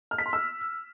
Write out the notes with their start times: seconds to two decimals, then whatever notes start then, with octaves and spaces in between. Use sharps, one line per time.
0.11 F6
0.18 B6
0.26 C6
0.33 E6